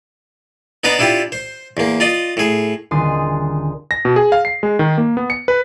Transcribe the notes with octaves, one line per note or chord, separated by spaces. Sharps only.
B3 D4 D#4 B4 A#5 D6
D4 E4 F4 G4
C5
E2 A#3
F4 D5 D#5
A2 G#4
D#1 D3 G#4 C6 D#6 A6
A#6
B2
G#4
F5
C7
G#3
D#3
A#3
B3
C#7
B4